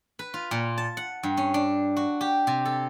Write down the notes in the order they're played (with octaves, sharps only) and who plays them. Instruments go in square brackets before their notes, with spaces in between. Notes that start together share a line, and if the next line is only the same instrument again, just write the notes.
[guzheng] B4
F4
A#2
A5
F#5
G2
C#4
D4
F#4
G4
C3
A4